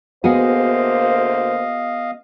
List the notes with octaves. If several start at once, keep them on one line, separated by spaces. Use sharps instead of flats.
D2 A#3 B3 F#4 G#4 C5 D#5 F5